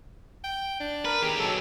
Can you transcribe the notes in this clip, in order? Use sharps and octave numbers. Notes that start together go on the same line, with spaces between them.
G5
D4
A#4 B4
D#3 G4 G#4
B1 F#3 A4